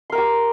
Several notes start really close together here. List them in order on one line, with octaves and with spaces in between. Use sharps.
C6 A#4 G5 G4